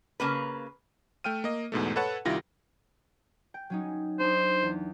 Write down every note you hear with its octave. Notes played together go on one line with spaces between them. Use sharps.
C#3 A#3 B4
A3 G5 F6 D#7
A#3 D#5
E2 G#2 B2 A3
A4 B4 C#5 F#5 A5
C2 D#3 E4 F4 G4 A#6
G5
F#3 C#4 D#4
D4 D#4 C5
E2